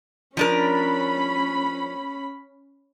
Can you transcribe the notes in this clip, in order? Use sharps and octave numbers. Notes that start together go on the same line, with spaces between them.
F3 C#4 D4 A#4 B5